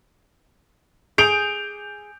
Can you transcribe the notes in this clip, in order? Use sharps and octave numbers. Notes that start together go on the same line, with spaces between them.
G#4 G6 D7 F7